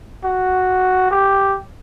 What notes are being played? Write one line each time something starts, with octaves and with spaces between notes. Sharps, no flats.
F#4
G4